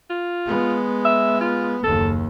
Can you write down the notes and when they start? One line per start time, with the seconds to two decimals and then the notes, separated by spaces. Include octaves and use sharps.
0.10 F4
0.46 G#3 B3
1.05 E5
1.41 F4
1.84 F#1 D#2 A4